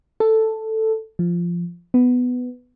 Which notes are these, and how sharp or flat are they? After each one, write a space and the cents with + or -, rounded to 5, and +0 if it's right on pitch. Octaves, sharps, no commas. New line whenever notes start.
A4 +5
F3 -10
B3 +10